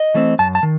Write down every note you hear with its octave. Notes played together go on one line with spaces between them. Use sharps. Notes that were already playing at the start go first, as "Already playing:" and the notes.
Already playing: D#5
E3 A3 C4
F#2 A5
A5
D#3